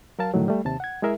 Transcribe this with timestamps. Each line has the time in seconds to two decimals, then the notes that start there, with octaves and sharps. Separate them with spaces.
0.19 F#3 A#4 F5 A5
0.34 A2 D3 D#3 F3 F#3 A3
0.48 G3 A3
0.65 D#2 C3 A5
0.80 F#5 G#6
1.02 G#3 E4 G#4 A#4 E5